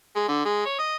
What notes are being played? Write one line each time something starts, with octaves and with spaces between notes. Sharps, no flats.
G#3
D3
G#3
C#5
D#5